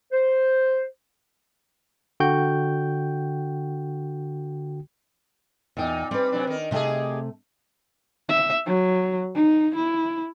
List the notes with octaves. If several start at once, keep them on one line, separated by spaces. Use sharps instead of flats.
C5
D3 F#4 G5 G6
E2 A#2 D#4 G5
G3 C4 B4
C3 F#3 D4
D#3 A#4
C3 A3 D#4 G4 G#4
E5
F#3
D#4
E4